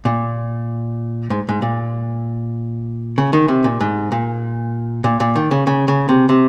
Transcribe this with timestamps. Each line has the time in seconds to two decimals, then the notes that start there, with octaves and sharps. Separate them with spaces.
0.05 A#2
1.30 G#2
1.49 G#2
1.62 A#2
3.18 C#3
3.33 D#3
3.48 C3
3.64 A#2
3.81 G#2
4.12 A#2
5.04 A#2
5.20 A#2
5.36 D#3
5.51 C#3
5.67 C#3
5.88 C#3
6.09 C3
6.29 C3